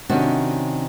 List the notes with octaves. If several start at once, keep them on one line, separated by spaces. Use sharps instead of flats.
C3 D#3 C#4 D4 F#4